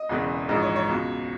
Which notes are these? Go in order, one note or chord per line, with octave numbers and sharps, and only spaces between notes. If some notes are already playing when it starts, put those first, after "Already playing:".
Already playing: D#5
E1 E2 C#3 E3
A#1 G#2 E3 D#5
C#5
C#5
C#2 B2